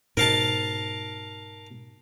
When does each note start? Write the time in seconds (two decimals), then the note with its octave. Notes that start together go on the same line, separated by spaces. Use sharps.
0.17 G#2 B2 A#4 F5 A5